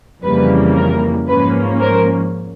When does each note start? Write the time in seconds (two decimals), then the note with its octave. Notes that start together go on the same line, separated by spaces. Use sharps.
0.24 F2 C#3 E3 G3 A#3 B4
0.77 A#4
1.28 G#2 F3 A#3 C#4 B4
1.81 A#4 C5